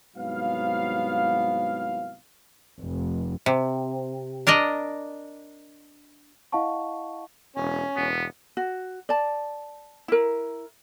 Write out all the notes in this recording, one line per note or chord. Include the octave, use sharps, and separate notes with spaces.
C2 G#2 F#3 B3 F5
F1
C3
D4 A#4 D5 D#5
E4 D#5 F5 F#5 A5 C#6
E1 C#4
E1 B3
F#4
D5 A5
E4 A#4